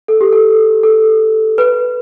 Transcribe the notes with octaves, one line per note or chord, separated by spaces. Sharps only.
A4
G4
A4
A4
B4